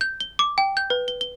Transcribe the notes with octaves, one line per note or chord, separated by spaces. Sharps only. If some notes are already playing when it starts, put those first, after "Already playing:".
G6
G7
D6
G5
G6
B4
G7
G7